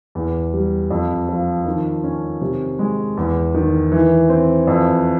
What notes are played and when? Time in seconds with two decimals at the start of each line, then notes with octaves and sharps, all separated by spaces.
0.15 E2
0.53 G3
0.90 F2
1.29 F3
1.66 D#3
2.04 C#4
2.41 C3
2.79 G#3
3.17 E2
3.54 D#3
3.92 E3
4.29 C4
4.67 F2